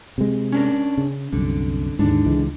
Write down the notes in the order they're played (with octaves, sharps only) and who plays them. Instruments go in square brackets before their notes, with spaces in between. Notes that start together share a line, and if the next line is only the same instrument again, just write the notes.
[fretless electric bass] C3 G#3
[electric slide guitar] C#4 D4 A#4
[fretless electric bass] C#3
[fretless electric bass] C2 F#2 [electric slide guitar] D3
[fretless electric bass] D#2 G#2 [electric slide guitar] D3 D4
[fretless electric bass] C#2 E3 G#3